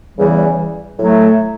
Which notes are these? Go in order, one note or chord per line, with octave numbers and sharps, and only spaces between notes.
E2 C#3 E3 G3
A2 F#3 A3